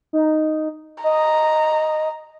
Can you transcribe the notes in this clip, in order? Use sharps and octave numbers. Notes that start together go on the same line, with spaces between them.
D#4
D#5 A#5